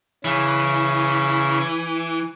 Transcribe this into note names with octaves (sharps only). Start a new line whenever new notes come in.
C#3 E3